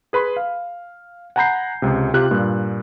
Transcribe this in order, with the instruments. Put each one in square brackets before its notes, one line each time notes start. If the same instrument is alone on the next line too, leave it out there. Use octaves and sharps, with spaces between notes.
[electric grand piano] G#4 B4 B5 C6
F5
F#5 G#5 A#5 B5 G6 C7
C#2 C3
C3 F4 G4 F#6
G2 A#2